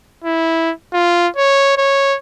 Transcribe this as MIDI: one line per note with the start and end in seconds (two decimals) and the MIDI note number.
0.25 0.71 64
0.93 1.28 65
1.37 1.75 73
1.77 2.16 73